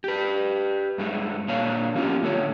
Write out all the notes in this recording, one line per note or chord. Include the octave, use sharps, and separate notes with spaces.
G4 B4
G2 G#3 A3
A#2 D4 C#5 F5
F3 F#3 B3 C#4 F4 G4
A2 D3 C#5